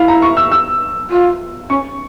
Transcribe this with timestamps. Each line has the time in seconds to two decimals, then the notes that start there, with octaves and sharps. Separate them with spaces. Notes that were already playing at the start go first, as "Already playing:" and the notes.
Already playing: E4 E5 F5
0.08 A#5
0.22 C#6
0.37 E6
0.52 E6
1.10 F4
1.69 C#4 C#6